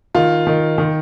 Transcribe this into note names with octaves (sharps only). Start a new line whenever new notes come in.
D#3 F4
D#3
D#3